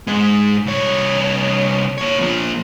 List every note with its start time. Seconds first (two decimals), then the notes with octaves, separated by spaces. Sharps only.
0.07 G#2 G#3
0.66 C2 C#5
1.98 A#3 C#5
2.21 F3 A#3